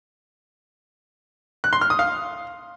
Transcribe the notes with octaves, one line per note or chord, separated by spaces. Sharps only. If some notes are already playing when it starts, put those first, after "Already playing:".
F#6
C6
F6
D#6
F5